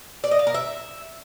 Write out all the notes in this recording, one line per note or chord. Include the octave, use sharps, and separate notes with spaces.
D5
D#5
F5
A#4
E5